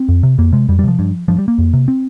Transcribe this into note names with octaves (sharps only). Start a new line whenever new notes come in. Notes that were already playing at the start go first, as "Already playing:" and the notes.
Already playing: C4
F2
C3
F2 A#3
C3 G#3
F2 G3
G3
C3 F3
G2
G2 F3
G3
A#3
F2
C3
C4